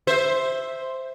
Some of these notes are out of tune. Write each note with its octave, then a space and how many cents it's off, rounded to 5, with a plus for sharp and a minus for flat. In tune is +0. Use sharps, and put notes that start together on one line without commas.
C5 +0 E5 +0